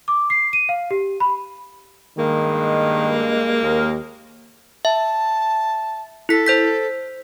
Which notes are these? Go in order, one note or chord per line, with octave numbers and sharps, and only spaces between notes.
D6
C7
D#7
F5
G4
B5
G2 D#3 G#3 A#3
D#2 G#3 G#4 A#4
E5 A5
E4 A4 B6
C5 G6 B6